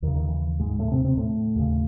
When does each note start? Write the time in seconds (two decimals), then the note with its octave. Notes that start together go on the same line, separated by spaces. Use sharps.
0.02 D#2 D#3
0.07 C#3
0.15 D#3
0.28 E3
0.59 G#2 G#3
0.79 A2 A3
0.92 C3 C4
1.04 C3 C4
1.17 A2 A3
1.56 D#2 C#3